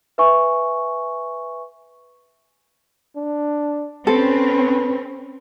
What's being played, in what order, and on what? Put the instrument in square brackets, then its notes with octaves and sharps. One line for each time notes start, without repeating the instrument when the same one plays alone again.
[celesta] B4 E5 G#5 C#6
[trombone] D4
[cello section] C4 C#4 [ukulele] A4 [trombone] B4